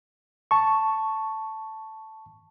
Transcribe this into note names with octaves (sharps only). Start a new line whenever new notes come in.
A5 C#6